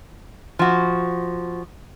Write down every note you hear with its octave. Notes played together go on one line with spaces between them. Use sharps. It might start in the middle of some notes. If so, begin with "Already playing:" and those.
F3 F#4